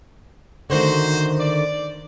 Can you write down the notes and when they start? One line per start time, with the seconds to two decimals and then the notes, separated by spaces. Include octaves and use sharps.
0.70 D3 D#3 A3 F#4 C5
1.39 D5